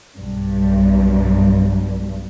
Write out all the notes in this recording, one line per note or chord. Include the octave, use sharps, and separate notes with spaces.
B1 G2